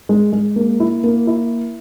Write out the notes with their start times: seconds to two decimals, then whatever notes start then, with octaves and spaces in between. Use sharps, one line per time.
0.09 G#3
0.33 G#3
0.56 A#3
0.80 E4
1.04 A#3
1.27 E4